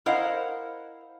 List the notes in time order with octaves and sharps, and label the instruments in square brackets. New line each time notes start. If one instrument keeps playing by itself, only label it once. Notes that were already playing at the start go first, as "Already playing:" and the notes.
[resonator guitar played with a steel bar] E4 A#4 C5 D#5 F5 F#5